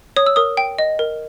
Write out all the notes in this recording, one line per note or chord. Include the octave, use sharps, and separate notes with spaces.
C#5 D#6
E6
A#4 D#6
G5
D#5
A#4